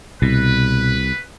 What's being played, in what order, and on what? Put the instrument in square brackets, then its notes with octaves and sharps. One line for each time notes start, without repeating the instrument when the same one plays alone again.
[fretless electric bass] C2 [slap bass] B2 [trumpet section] B4